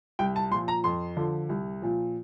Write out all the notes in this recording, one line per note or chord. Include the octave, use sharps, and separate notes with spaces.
C2 G5
A5
A#2 F3 C6
A#5
F2 C6
D3 F3
C2
A#2 F3